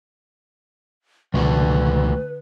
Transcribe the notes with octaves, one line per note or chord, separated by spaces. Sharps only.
C#2 B2 D3 D#3 F3 A3 F#4 B4